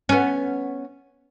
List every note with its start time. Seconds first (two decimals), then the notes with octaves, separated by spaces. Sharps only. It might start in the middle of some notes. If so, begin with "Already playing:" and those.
0.09 B3 C#4